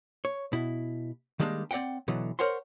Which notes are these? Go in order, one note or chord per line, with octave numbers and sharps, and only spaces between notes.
C#5
B2 E4
D#3 G3 G#3 A#3 D4
C4 D5 E5 F#5 G5
B2 D3 E3 F#3
A#4 C5 C#5 F#5 C6